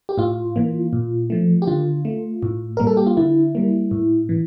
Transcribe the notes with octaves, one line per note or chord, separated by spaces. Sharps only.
G4
A2 F4
E3 A#3
A#2
F3 A3
G4
D3 F4
A3
A2
G3 A#3 A#4
A4
G4
F4
D3 E4
G3 A#3
A2
E3